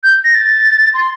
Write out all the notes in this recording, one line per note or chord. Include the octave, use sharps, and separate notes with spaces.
G6
A#6
A6
C6